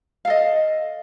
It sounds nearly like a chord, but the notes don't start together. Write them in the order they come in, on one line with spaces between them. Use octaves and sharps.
F5 A4 D#5